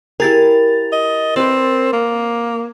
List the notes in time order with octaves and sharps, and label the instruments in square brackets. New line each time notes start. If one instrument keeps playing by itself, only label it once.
[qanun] E4 G4 G#4 [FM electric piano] A#4 A6
[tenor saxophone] D#5
[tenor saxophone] C4 [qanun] B4 C5 D5
[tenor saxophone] A#3